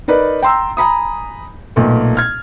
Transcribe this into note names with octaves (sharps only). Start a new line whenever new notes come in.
D#4 A#4 B4 D5
G5 A#5 C6 E6
G#5 A#5 B5 D#6
B1 A#2 A3
F6 G#6